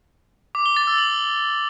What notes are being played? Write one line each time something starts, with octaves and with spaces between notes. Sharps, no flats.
D6
G7
A6
E6
F#7